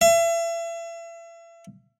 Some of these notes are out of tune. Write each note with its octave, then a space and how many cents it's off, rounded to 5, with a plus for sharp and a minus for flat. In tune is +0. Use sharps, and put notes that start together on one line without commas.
E5 +35